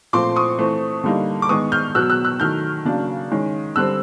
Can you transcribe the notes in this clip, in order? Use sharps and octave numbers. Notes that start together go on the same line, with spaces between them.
A#2 F3 A3 C4 C6 D6
C#6 D#6
E3 A3 C4
D3 G3 A#3 D#4
D6
D#3 G#3 B3 C#6 D#6
F6 G6
B2 F#3 B3 E6 F#6
E6 F#6
E6 F#6
D#3 F#3 A3 F6 G6
C#3 F#3 A#3 D4
D#3 G#3 C#4
D3 G3 C4 E6 F#6